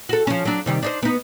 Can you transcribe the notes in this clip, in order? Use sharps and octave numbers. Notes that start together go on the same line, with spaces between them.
F#4 A4
F3 C#4
F#3 D4
C3 D#3 G3
D4 D#4 C5
B3 D#4